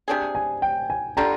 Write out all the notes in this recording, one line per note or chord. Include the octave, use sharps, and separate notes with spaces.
C3 G3 D4 G#4
G#5
G5
G#5
D3 G3 D4 F4 A#5